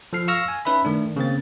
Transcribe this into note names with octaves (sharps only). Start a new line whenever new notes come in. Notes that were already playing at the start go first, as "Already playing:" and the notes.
F3 A4 F6 C7
F5 C#6 E6 F6 A#6
G#5
C#4 D#4 B4 E5 B5
D#3 A3 D4
C#3 A#3 C4 A6